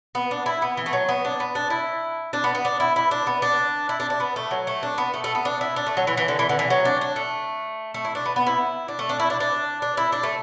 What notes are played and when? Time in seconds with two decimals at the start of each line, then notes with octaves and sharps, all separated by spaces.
0.15 B3
0.31 D4
0.46 E4
0.62 B3
0.77 E3
0.86 A3
0.93 F#3
1.09 B3
1.25 D4
1.40 B3
1.55 D4
1.70 E4
2.33 D4
2.44 B3
2.55 B3
2.65 D4
2.80 E4
2.96 E4
3.11 D4
3.27 B3
3.42 D4
3.89 E4
4.00 D4
4.10 D4
4.20 B3
4.36 A3
4.51 F#3
4.67 A3
4.83 D4
4.98 B3
5.14 A3
5.24 A3
5.35 B3
5.45 D4
5.61 E4
5.76 D4
5.87 A3
5.97 F#3
6.07 E3
6.17 E3
6.28 D3
6.39 E3
6.49 D3
6.59 E3
6.70 F#3
6.85 D4
7.01 D4
7.16 A3
7.94 A3
8.05 E4
8.15 D4
8.26 B3
8.36 B3
8.47 E4
8.88 D4
8.99 A3
9.09 D4
9.20 E4
9.30 D4
9.40 D4
9.82 D4
9.97 E4
10.12 D4
10.23 A3